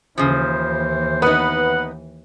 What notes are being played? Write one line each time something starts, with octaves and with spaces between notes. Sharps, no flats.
D#2 C#3 E3 F3 C5
B3 D#4 B4 F#5